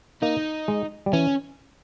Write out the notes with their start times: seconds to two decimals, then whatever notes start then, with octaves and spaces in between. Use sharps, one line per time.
0.22 A#3 D#4
0.68 G#3
1.06 G3
1.13 E3 C#4